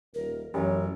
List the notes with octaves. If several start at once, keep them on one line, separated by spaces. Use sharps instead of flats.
D#1 A#4
A1 F#2 C#5